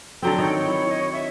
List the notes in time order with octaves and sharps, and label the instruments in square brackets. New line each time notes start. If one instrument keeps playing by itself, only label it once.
[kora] D3 F#3 C4 [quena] A4 [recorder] G5
[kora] D#3 [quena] C#5
[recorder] E4
D#5
E5